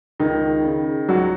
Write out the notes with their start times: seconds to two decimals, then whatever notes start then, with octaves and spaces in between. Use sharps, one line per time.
0.20 C#2 D#3 D#4
0.64 C#3
1.09 C#2 F#3 F#4